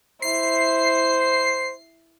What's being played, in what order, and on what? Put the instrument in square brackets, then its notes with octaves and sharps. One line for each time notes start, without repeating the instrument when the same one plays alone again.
[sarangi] E4 [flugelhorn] C5 [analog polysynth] C7